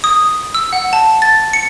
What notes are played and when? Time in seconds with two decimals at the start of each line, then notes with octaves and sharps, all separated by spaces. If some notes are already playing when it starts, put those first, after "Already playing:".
0.04 D#6
0.55 E6
0.73 F#5
0.93 A5
1.22 A6
1.53 C#7